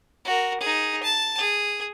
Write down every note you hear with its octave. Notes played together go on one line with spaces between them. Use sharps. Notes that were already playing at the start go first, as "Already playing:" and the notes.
F#4 A#4
D#4 G#4
A5
G#4